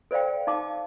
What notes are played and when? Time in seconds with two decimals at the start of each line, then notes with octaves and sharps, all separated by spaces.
0.11 A4 C5 D5 F5 G5
0.47 D#4 F5 A5 D6